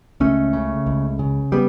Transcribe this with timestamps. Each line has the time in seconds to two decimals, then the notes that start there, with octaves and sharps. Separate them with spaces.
0.20 C#2 A3 C#4
0.53 C#3
0.87 C#2
1.19 C#3
1.52 G3 B3